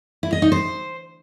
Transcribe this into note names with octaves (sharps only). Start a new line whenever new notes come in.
E4
D#5
D#4
C5